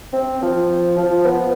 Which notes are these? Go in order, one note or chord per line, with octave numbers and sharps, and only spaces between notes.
C4
F3
F3
B3